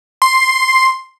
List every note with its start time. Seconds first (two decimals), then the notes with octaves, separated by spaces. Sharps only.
0.22 C6